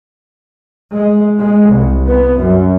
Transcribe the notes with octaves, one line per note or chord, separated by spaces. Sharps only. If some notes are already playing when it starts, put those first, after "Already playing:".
G#3
G#3
C2
B3
F#2